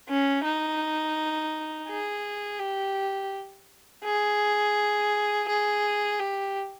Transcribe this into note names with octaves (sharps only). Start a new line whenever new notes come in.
C#4
D#4
G#4
G4
G#4
G#4
G4